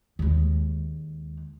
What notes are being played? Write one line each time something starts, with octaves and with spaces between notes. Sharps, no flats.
D#2 G#3